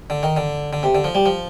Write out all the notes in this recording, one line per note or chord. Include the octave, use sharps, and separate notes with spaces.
D3
D#3
D3
D3
C3
D3
F3
G3
F3